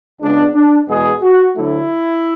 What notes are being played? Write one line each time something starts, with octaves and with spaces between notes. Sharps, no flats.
C#2 C#3 G#3 B3 D4
D4
E2 B2 G#3 B3 G#4
F#4
D2 D3 F#3 A3 E4